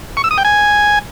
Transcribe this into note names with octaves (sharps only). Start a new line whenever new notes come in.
C#6
E6
D#6
G5
G#5